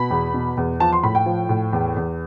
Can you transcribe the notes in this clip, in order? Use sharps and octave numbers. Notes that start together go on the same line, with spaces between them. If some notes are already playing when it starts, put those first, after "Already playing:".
Already playing: B2 B5
E2
B2
E2
F3 A5
C6
A2 B5
G5
F3
A2
E2
E2